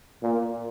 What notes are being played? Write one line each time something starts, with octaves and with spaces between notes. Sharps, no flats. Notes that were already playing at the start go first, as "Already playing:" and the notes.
A#2